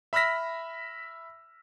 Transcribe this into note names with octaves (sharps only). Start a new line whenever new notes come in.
E5 B5 E6 F6 A#6 B6